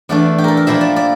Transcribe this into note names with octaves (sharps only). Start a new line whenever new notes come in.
E2 E3 A3 D4 D5
G4
A4 A#4
A#4
A#2 F3 A#3 E4 E5
D5
D5